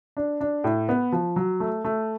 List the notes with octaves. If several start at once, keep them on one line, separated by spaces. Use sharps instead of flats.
D4
D4
A2
B3
F3
F#3
A3
A3